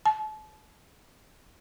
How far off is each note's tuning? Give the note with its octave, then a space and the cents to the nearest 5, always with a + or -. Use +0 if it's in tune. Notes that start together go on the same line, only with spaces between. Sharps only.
A5 -35